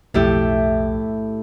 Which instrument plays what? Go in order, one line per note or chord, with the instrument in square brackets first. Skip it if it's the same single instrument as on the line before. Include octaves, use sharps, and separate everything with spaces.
[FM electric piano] B1 F2 E5 [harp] A2 E4 G4